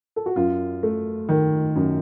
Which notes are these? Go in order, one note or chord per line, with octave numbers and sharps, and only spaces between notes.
A4
F#4
F#2 F4
A3
D#3
F#2